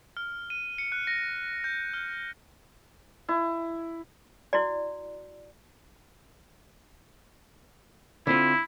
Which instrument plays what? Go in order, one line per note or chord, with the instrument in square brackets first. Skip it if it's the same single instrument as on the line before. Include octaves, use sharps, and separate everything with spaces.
[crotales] F6
D#7
C#7
F#6
A#6
G6
F6
[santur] E4
[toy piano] E4 F#4 D5
[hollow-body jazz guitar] D3 C4 F4 [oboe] E4